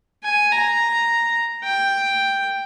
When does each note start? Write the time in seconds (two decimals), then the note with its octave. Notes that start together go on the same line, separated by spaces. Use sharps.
0.24 G#5
0.52 A#5
1.64 G5